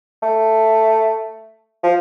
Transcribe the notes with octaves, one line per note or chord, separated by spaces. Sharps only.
A3
F3